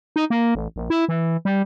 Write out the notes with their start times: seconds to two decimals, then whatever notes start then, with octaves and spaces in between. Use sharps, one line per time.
0.16 D#4
0.30 A#3
0.55 A1
0.76 A#1
0.90 E4
1.09 E3
1.45 G3